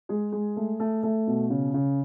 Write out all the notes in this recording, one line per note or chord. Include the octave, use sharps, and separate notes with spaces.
G#3 G#4
G#3
A3
A3
A3
B2
C#3
C#3